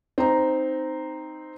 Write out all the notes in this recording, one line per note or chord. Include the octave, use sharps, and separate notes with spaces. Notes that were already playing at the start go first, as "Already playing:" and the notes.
C4 D#4 A#5